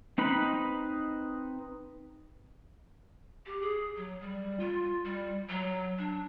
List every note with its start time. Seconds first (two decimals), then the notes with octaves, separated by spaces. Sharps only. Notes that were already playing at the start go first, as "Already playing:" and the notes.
0.18 C4 D#4 B4 B5
3.46 G4
3.62 G#4
3.97 F#3
4.21 G3
4.60 F4
5.05 G3
5.49 F#3
5.99 D4